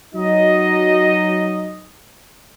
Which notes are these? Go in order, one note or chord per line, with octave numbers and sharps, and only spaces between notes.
F#3 D#4 D#5